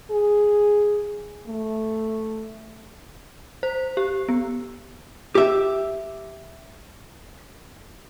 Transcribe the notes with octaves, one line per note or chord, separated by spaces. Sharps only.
G#4
A3
C5
G4
B3
G4 E5